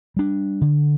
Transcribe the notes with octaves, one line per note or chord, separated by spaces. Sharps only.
G3 D4
D3